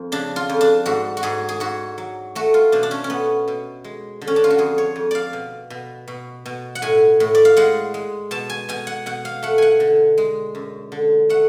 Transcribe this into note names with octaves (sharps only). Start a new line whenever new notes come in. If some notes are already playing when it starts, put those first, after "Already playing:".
Already playing: F2
C#3 D4
F4
F2
D4
G#2 F#4
F#4
G#2 G#4
G#4
G#2 F#4
F#3
A3 F#4
F4
B2 D4
D4
C#4
C#4
A3 B3
B2
G#3
D3
C#4
D4
F4
F#4
F2 G#4
C#5
F2
D5 F5
B2
B2
B2
B2
F#5
A2 G#5
A2
D5
F5
G#3 F#5
G#3
B2 A5
G#5
B2 G#5
F#5
B2 F#5
F5
A3 F#5
F#5 G#5
D3
G#3
F#2
D3
A3 F#5